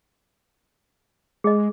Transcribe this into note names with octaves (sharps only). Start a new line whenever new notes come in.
G#3 G#4 D#5